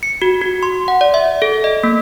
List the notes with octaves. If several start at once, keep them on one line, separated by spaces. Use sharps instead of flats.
C#7
F#4
F#4
C6
F#5
D5
E5
A4
D#5
A#3